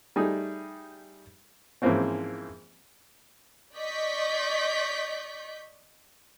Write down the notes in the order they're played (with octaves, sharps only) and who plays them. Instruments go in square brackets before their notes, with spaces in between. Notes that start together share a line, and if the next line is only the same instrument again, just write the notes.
[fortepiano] G3 A3 D#4 G#4
G#2 E3 F3 A#3 C4 C#4
[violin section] D5 D#5 C#6 G6 B6